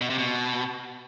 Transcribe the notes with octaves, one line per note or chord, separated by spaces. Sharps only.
B2
C3
B2